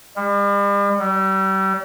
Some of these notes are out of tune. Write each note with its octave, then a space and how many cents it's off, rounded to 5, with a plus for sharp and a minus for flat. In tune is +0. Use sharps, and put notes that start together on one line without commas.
G3 +45
G3 -35